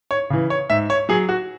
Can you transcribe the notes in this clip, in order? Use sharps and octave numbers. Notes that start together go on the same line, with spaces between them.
C#5
C#3 E3
C#5
G#2 E5
C#5
F#3 G#4
F#4